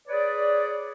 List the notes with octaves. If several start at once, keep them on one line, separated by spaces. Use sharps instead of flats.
G#4 B4 C#5 D5